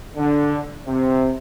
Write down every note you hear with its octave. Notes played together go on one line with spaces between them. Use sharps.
D3
C3